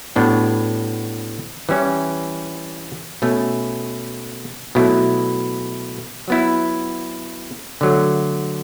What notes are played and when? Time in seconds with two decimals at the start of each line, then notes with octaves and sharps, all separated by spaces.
0.15 A2 G3 B3 D4 F#4
1.69 E3 G3 C#4 E4
3.22 B2 A3 C#4
4.75 B2 F#3 A3 E4
6.28 F#3 B3 E4
7.81 D3 F#3 A3